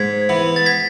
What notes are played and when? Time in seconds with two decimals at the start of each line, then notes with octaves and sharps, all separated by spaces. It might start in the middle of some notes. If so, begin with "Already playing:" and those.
Already playing: G#2 G#6 B6
0.29 E3 B3
0.56 A6
0.66 G#6 B6